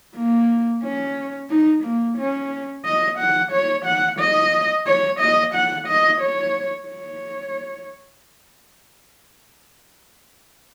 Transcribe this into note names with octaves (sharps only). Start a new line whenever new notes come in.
A#3
C#4
D#4
A#3
C#4
D#5
F#5
C#5
F#5
D#5
C#5
D#5
F#5
D#5
C#5
C#5